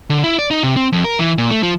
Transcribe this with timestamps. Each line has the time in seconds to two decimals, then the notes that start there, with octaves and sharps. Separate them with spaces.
0.10 D3
0.24 E4
0.39 D5
0.51 D#4
0.63 C3
0.77 C4
0.93 F2
1.04 A#4
1.19 E3
1.38 A#2
1.51 A3
1.63 F3